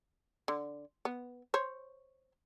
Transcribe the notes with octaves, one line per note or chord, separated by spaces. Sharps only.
D3
B3
C5 C#5